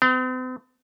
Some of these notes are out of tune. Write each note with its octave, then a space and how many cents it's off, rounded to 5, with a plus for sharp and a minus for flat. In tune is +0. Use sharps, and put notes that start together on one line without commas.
C4 -45